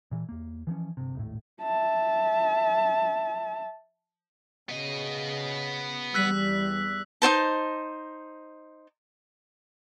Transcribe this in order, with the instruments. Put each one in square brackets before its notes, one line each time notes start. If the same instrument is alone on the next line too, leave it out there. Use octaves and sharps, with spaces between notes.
[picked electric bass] A#2 E3
E2 A#3
E3 F3 G#3 C#4
G1 C3
D#1 G#1 A2
[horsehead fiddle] E5 A5
[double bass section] C#3 [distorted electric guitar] B3 D#5
[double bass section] E2 G3 [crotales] E6 F#6 B6
[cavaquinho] D#4 F#4 C5 A5